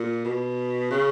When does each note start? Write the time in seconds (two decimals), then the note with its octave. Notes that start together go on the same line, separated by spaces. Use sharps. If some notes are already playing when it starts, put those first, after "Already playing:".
Already playing: A#2
0.25 B2
0.91 C#3